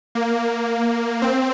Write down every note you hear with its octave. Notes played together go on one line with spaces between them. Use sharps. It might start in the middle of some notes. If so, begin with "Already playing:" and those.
A#3
C4